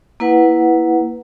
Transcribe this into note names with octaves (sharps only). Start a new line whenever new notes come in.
A#3 E4 B4 F#5